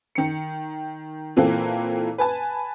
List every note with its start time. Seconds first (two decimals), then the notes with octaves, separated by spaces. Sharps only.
0.15 D#3 C#7
1.36 A#2 E3 A#3 C4 A4
2.18 B4 G#5 A5